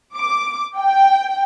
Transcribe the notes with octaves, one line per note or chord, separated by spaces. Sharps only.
D6
G5